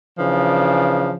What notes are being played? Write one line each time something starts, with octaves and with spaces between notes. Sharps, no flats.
C#3 E3 F3 D4